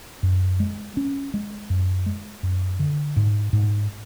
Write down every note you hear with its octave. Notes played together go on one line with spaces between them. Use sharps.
F#2
G#3
C#4
G#3
F#2
G#3
F#2
D3
G#2
G#2